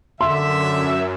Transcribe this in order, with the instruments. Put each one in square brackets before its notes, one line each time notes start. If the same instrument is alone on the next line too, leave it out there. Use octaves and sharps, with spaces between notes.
[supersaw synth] F#2 [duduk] D3 [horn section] E5 [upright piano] C6